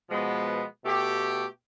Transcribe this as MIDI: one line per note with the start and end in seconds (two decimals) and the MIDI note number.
0.10 0.63 47
0.10 0.63 53
0.10 0.63 56
0.10 0.63 59
0.85 1.45 47
0.85 1.45 57
0.85 1.45 67